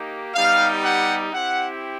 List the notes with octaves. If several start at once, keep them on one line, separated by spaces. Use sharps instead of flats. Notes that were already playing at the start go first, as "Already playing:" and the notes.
Already playing: A#3 D#4 G4
G3 B3 D#4 G4 F5
F#5
C4 E4 G4 F#5